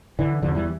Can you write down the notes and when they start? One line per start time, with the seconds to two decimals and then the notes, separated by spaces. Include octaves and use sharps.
0.19 D3 E3
0.42 E2 D3 F3
0.55 E3 G3